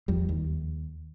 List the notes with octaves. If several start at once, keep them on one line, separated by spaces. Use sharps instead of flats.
E2 F3 G3
D#2